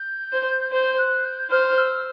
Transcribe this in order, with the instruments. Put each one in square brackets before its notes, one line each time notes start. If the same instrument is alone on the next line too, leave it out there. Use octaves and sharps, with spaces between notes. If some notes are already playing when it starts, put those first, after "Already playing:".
Already playing: [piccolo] G6
[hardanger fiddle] C5
[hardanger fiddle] C5 [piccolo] G6
[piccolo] F#6
G6
[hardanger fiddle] C5 [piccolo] F6
[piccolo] E6